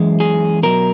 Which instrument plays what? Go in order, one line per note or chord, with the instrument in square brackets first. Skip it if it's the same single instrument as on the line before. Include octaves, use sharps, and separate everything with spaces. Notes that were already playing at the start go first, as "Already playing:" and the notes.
Already playing: [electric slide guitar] F#2 E3 G#3
G#4
B2 F#3 A#4